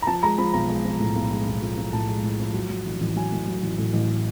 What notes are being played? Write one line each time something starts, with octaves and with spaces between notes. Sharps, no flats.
A#5
F3 A5
G#3 A#5
F3 B5
B1 A#5
G#3
F3
A2
B1
G#3
B1
F3
F3
A2 A5
G#3
A2
F3
F#3
F#3
A1
A1
F#3 G#5
A2
F#3
A1
A2
A1